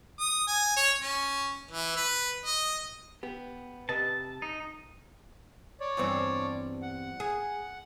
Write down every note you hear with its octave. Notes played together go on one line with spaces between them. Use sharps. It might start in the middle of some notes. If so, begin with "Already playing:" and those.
D#6
G#5
C#5
C#4
E3
B4
D#5
B3 G4
C3 B4 D#5 A5
D#4
C#5 D5
E2 G2 C4
F#5
G#4